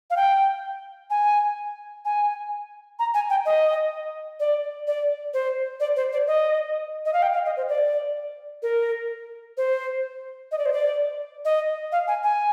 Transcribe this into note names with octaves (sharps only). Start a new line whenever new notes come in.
F5
G5
G#5
G#5
A#5
G#5
G5
D#5
D5
D5
C5
D5
C5
D5
D#5
D#5
F5
G5
F5
D#5
C5
D5
A#4
C5
D#5
D5
C5
D5
D#5
F5
G#5
G#5